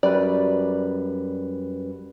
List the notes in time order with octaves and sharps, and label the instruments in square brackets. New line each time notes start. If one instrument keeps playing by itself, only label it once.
[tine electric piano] F#2 G3 B4 [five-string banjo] D5